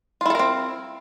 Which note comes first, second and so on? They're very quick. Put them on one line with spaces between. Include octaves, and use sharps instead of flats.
F4 E4 A4 A#4 C4